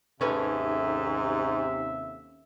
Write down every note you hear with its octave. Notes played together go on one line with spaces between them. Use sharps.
D#2 G#2 C3 C#4 A4 B4 E5